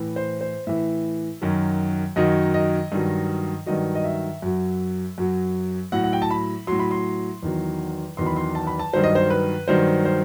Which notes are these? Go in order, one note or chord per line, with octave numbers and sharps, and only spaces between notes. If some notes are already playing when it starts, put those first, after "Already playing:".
Already playing: A2 E3
C5
C5
A2 E3 E5
F#2 D#3 F#3
F#2 D#3 F#3 D#5
D#5
G2 D#3 F#3
G2 D#3 F#3 D#5
D#5
E5
F#2 F#3
F#2 F#3
A2 F#3 F#5
F#5
G5
A5
B5
A2 F#3 C6
B5
C6
E2 D#3 F#3
E2 D#3 F#3 C6
B5
C6
A5
B5
A5
G2 D#3 F#3 C5
D#5
C5
B4
G2 D#3 F#3 C5
C5